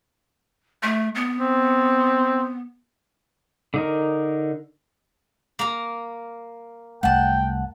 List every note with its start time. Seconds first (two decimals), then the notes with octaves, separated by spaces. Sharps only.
0.83 A3
1.15 B3
1.40 C4
3.74 D3 D#4 A#4
5.59 A#3 A#5
7.03 C2 F#2 A3 F#5 G5 A5